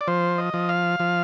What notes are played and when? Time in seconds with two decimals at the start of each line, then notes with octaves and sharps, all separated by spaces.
0.01 D5
0.08 F3 C5
0.38 D#5
0.54 F3
0.69 F5
1.00 F3